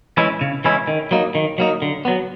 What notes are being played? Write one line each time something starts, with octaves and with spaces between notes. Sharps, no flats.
E3 G#3 C#4 E4
C#3
E3 G#3 C#4 E4
D#3
F#3 A#3 D#4
D#3
F#3 A#3 D#4
D3
F#3 B3